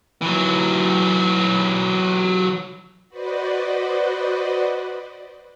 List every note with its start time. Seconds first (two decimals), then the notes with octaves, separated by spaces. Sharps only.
0.22 E3 F#3
3.09 F#4 B4 C5 D5 D#5